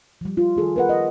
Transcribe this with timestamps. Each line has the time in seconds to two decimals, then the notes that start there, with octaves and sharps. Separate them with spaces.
0.21 F3 G3
0.37 F4
0.57 D#3 G#4 A4
0.76 A#4 B4 F#5
0.89 D#5